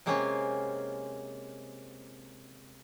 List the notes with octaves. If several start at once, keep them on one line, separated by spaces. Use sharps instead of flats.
C3 G#3 A#3 C4 C#4 F4